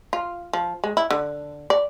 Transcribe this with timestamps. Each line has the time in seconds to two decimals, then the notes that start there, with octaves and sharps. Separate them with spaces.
0.13 F4
0.53 F3
0.84 G#3
0.97 E4
1.11 D3
1.70 D5